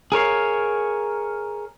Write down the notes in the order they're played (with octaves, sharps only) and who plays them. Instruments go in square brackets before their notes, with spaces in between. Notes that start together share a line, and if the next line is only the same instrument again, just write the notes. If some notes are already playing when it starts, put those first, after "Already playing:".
[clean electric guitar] G#4 A#4 C#5 F5